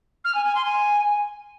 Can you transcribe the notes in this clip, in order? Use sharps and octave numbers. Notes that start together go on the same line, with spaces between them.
F6
G#5
G#5
C6
G#5